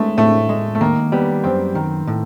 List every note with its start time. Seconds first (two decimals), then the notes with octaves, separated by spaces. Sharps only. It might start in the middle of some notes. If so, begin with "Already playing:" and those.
Already playing: G#3 A3 B3
0.17 A2 A3
0.49 G#3
0.75 A3
0.81 D#3 A#3
1.12 G3 B3
1.44 F#2 C4
1.75 D#3
2.07 A2